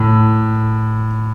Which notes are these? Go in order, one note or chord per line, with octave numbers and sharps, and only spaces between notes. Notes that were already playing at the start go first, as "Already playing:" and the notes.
Already playing: A2